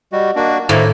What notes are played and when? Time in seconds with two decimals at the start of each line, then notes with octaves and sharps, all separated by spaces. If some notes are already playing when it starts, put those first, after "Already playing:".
0.12 G3 F#4 D#5
0.36 A#3 D4 F#4
0.69 A2 D#3 A#3 E4 C5